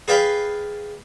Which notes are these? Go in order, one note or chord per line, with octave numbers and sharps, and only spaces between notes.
G#4 B4 D5 F5 G5 B5